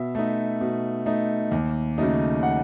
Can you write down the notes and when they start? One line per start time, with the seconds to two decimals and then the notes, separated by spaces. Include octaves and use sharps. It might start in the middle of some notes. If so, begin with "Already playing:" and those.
Already playing: B2 E5
0.15 A3 D#4
0.61 B2
1.06 A3 D#4
1.51 D#2
1.98 C#3 F#3 A3 D#4
2.43 F#5